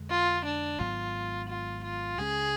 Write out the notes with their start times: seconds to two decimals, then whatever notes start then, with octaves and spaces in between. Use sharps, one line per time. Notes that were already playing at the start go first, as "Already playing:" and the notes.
Already playing: F2 D3 G#3
0.10 F4
0.46 D4
0.79 G#1 G#2 F#3 B3 F4
1.49 F4
1.84 F4
2.18 C#2 C#3 G#3 C#4 G#4